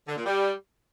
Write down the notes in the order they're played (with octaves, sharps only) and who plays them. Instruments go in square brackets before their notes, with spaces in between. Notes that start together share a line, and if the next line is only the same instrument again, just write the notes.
[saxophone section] D3
A#2
G3